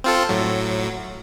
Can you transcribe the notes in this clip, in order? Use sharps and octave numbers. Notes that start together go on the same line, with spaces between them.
C4 F4 A4
A2 F#3